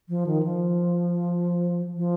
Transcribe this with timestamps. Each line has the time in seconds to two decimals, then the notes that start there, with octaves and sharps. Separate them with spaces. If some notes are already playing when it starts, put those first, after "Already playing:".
0.09 F3
0.27 D#3
0.43 F3
1.96 F3